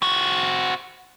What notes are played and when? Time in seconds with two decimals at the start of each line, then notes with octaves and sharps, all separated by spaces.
0.02 C4 F#4